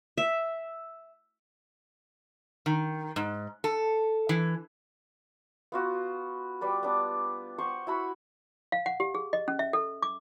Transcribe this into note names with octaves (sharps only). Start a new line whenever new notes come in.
E5
D#3
G#2
A4
E3
B3 F4 F#4
G3 B4 D5
B3 D4
C5 F#5 C#6
E4 F#4 B5
F5
F#5
G4
G#4
D#5
C#4
E5
A4
D6